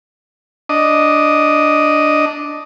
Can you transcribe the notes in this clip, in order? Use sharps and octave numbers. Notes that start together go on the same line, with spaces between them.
D4 D#5